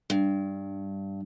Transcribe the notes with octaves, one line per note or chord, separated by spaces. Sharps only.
G2